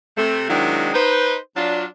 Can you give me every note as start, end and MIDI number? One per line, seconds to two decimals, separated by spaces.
0.17 0.47 48
0.17 0.47 57
0.50 0.89 51
0.50 0.89 54
0.50 0.89 56
0.50 0.89 60
0.50 0.89 62
0.50 0.89 64
0.94 1.36 63
0.94 1.36 71
0.94 1.36 72
1.56 1.85 54
1.56 1.85 62
1.56 1.85 65